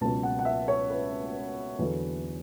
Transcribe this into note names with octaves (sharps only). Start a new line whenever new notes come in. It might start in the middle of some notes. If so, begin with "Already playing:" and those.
C#2 B2 F#3 A5
F#5
F#5
E5
C#5
B4
E2 D3 F#3